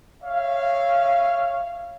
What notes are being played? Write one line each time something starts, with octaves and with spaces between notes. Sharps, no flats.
C#5 E5 F5